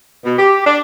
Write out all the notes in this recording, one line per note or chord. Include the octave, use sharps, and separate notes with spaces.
B2
G4
D4